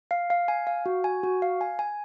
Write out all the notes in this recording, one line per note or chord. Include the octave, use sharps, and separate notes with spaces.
F5
F5
G#5
F5
F#4
G#5
F#4
F5
G#5
G#5